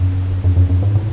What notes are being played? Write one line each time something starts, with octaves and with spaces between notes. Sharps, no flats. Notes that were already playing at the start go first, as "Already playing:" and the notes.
Already playing: F#2
F#2
F#2
F#2
G#2
A2